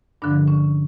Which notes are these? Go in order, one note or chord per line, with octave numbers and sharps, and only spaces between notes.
G2 D3 F3 D4
C#4